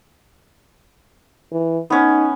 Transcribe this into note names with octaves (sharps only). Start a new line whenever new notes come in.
E3
B3 C#4 D#4